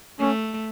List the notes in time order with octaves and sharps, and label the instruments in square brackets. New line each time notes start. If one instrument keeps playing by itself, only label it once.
[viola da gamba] A3 [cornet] C#4